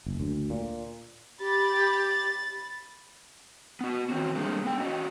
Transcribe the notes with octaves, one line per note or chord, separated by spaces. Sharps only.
F#1
D2
A#2
G4 B5 A6
B3 F#4
D#3 C4 C#4 F#4
G3 A3 A#3 C4 D4 G#4
B3 G5
C#4 F#4 D#5